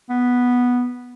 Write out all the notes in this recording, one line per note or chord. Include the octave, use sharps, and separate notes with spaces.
B3